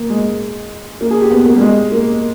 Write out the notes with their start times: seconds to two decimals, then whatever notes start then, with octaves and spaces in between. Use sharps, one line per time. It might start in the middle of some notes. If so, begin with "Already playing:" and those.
Already playing: A#3
0.10 G#3
1.01 A#3
1.11 G#4
1.21 G4
1.31 B3
1.46 A#3
1.56 G3
1.61 G#3
1.92 A#3